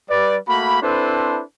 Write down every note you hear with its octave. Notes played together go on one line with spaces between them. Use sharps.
G3 B4 D5
A3 A#3 F#4 B5
C4 D4 E4 A4 B4 C5